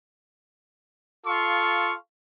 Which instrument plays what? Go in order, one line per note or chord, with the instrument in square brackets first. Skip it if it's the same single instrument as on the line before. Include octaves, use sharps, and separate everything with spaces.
[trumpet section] F4 A4 F5 C6 C#6